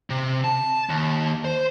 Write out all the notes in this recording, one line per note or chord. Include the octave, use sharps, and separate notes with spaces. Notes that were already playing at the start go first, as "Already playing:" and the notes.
C3
A5
D#2
C5